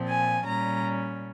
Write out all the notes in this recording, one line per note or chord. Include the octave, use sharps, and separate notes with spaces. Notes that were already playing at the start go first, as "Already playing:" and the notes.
Already playing: A#2 F3 C4
G#5
A#2 G3 C#4 A#5